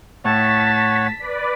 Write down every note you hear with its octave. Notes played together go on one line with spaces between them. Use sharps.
A2 C#5 F#5 A5 C#6 B6
B4 D5